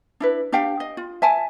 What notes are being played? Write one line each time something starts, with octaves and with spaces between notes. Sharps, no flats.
D4 E4 B4
D4 G4 F5 G5
D#5
F4
E5 G#5 A5